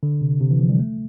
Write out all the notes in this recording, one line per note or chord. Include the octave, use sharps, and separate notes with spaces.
D3
C3
C3
E3
F3
G3
A3